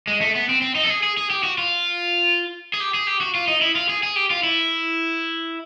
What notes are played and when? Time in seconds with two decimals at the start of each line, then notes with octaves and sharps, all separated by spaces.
0.07 G#3
0.21 A3
0.35 B3
0.49 C4
0.62 C4
0.75 D#4
0.84 A4
0.90 G#4
1.03 G#4
1.17 G#4
1.30 G4
1.43 F#4
1.58 F4
2.74 G#4
2.80 G4
2.94 G#4
3.07 G4
3.21 F#4
3.35 F4
3.48 D#4
3.61 E4
3.76 F4
3.89 G#4
4.03 G#4
4.16 G4
4.30 F4
4.43 E4